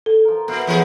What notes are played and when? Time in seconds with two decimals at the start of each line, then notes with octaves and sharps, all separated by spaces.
0.06 A4
0.25 F3 A#4
0.48 A#2 B3 E4
0.67 B2 E3 F#3 G#4